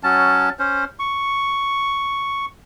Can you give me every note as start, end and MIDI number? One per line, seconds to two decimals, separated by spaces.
0.03 0.49 54
0.03 0.49 61
0.03 0.49 81
0.59 0.84 61
0.59 0.84 72
0.99 2.46 85